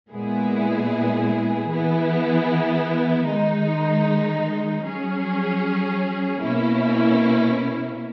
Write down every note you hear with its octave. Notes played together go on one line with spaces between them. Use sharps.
A#2 G#3 B3 E4 G#4
E3 B3 E4 G#4
D#3 G#3 D#4
F#3 C#4 G#4
B2 A#3 C#4 E4